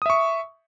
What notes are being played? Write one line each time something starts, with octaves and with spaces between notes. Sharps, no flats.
E5 C#6 D#6